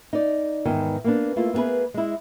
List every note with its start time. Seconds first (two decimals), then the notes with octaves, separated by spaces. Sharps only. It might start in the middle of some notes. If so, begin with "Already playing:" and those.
0.13 D#4 D5
0.65 E2 G#2 D#3 B3
1.04 A#3 B3 D4
1.36 A3 A#3 E4 F4
1.53 A#3 B3 F4 G#4 B4
1.94 G#3 E4